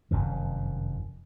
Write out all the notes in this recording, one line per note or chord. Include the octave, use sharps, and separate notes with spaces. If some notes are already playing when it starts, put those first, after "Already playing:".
F1 F#2 D#3